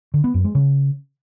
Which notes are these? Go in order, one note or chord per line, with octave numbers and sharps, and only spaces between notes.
D3
B3
F#2
G#3
C#3